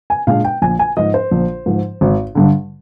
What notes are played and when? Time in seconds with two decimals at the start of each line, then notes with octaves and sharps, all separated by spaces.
0.10 G#5
0.27 A#2 G#3 D4 F5
0.45 G5
0.62 A#1 G#5
0.79 G#5
0.97 G#2 F3 D#5
1.14 C5
1.31 A#1
1.66 G#2 F3
2.01 G#1
2.35 G2 D3